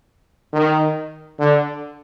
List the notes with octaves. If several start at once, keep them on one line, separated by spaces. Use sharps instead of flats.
D#3
D3